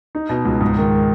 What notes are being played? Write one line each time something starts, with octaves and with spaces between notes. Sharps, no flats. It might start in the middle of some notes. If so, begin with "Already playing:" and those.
D#4
B2
C#2
G#2
D#3